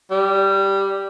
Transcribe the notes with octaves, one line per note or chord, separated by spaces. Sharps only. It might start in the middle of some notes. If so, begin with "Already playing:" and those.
G3